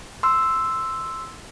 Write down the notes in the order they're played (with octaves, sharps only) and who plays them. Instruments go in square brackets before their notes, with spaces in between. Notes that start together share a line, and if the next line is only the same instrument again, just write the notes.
[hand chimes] C6 E6